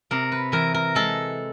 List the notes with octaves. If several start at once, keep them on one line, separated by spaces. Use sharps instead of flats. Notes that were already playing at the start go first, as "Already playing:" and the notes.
C3 A#4
B4
E3 A#4
A#4
G#3 A4